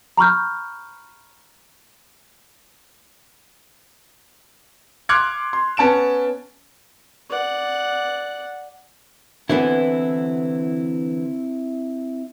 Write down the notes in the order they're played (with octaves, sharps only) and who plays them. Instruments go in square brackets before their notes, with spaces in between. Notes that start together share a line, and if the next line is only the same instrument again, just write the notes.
[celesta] A#5 B5 C#6 F6 G6
[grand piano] C6 D6 F6 F#6 G#6 C#7
C6
B3 C#4 A5 D7 E7
[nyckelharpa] D5 F#5
[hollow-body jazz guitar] D3 E3 B3 [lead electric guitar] C4 E4